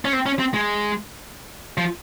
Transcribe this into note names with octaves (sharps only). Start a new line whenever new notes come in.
C#4
C4
C#4
C4
G#3
F3